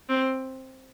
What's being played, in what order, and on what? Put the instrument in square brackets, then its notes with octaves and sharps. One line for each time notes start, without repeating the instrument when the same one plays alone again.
[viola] C4